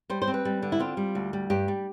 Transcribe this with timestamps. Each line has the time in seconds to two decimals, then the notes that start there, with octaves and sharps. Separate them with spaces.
0.10 G3 C5
0.22 C5
0.27 C4
0.34 B4
0.45 G3
0.62 D3
0.72 E4
0.80 C4 F4
0.97 G3
1.15 D2
1.33 G3
1.50 G2 G4
1.68 G3